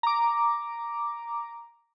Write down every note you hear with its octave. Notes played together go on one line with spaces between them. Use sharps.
A#5 D6